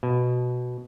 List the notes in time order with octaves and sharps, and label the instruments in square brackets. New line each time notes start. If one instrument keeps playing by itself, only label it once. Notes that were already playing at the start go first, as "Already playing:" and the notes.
[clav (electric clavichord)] B2